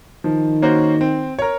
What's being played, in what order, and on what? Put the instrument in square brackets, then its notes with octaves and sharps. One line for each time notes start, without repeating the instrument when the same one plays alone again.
[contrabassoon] D#3 [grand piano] F3
[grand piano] A#3 C#4 F#4 C5
C4
A#4 C#5